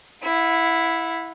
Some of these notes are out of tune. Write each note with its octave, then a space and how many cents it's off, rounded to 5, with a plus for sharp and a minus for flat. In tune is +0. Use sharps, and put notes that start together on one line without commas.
E4 +0 F#5 -35